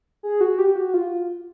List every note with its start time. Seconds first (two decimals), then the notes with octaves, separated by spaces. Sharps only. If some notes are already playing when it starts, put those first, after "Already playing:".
0.23 G#4
0.41 F#4
0.58 G4
0.76 F#4
0.94 F4